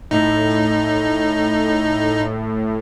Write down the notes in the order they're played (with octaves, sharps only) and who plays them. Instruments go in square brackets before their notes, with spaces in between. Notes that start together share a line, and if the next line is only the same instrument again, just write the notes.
[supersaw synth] A2 [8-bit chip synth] D#4